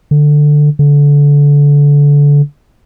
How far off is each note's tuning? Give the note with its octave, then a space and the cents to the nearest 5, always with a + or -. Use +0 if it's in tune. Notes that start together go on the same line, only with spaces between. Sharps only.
D3 +10
D3 -25